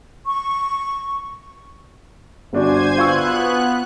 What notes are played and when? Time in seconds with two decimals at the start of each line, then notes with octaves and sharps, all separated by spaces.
0.25 C#6
2.53 G1 D4 F#4 C5 G#5 G#6
2.98 B3 F4 C#6 E6 F#6